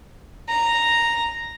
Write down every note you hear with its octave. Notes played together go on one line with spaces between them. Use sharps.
A#5